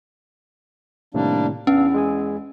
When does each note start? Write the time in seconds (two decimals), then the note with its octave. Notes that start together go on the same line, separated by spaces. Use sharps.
1.14 A2 C3 D#3 G3 A#3 D4
1.67 E2 B3 C#4 D4 F5
1.94 G#3 G#4 G#5